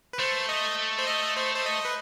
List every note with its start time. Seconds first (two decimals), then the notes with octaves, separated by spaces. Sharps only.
0.13 B4
0.19 A3 C5
0.49 D#5
0.98 C5
1.07 D#5
1.36 C5
1.55 C5
1.66 D#5
1.85 B4